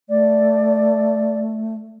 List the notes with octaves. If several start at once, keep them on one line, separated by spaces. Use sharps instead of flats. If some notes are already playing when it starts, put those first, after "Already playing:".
A3 D5